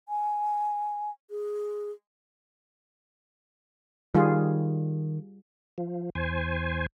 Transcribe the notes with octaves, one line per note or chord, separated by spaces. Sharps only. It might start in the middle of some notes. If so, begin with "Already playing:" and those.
G#5
G#4
D#3 G3 F4 G#4
F3
E2 C5 G#5